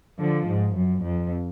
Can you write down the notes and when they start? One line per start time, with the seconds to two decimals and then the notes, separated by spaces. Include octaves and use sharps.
0.19 D3 F3
0.47 G#2
0.76 F#2
1.05 F2